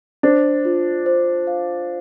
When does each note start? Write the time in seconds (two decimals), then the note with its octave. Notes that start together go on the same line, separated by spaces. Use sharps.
0.23 D4 C5
0.65 F4
1.06 C5
1.47 F5